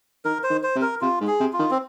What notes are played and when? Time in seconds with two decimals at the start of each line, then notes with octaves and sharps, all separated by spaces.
0.25 D#3 A#4
0.43 C5
0.50 D#3
0.63 C5
0.75 C3
0.82 A#4
1.01 C3 F4
1.20 G#2
1.27 G#4
1.40 C3
1.53 F4
1.59 D#3
1.71 C4